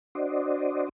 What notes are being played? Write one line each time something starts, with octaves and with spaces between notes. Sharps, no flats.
D4 F#4 C5 D5 D#5